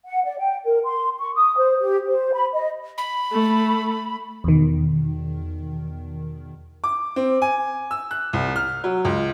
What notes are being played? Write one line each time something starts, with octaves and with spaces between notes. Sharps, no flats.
F#5
D5
G5
A#4
C6
C#6
D#6
C5
G4
C5
B5
D#5
B5
A3
E2 B2 D#3
D6
C4
G#5
E6
F#6
C2
F6
F#3
C#2